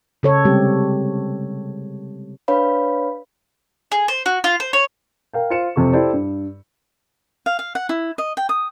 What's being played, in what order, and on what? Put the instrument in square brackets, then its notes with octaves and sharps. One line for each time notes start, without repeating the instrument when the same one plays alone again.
[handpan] C#3 A4 C#5
C3 G3 G#3 C4 G4
[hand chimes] D4 B4 C#5 F5 B5
[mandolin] G#4
C5
F#4
F4
C5
C#5
[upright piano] A#4 F5 G5
F4 C5 C#7 E7
F2 C3 A4 C#6
E4 G4 A4 C5 D5
G2
[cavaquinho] F5
F5
F#5
E4
D#5
G5
D#6